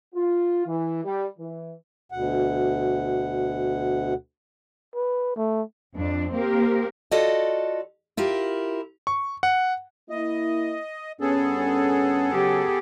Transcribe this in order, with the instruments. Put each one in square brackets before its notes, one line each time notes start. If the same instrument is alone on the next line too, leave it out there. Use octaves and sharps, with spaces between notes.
[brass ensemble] F4
E3
G3
E3
[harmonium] D2 B2 F#5
[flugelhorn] B4
A3
[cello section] F2 D4
A#3 C4 G4 A#4
[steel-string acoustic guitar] F4 F#4 A4 D5 D#5
E4 F4 G4 A#4
[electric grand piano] C#6
F#5
[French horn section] A#3 E4 [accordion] D#5
[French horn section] G2 C#4 [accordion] B3 G#4 A4
[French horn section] C#3 F#3 [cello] G4